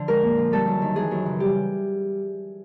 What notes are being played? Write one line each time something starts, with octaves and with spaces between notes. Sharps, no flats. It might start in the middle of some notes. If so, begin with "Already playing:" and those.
Already playing: D3 F3
G#3 A#4
A#2
F3
G3 A4
F#2
D#3
E3 G#4
F#2
C#3
G3 G4